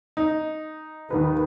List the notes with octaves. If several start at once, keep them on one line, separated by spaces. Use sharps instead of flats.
D#4
D#2 D#3 B4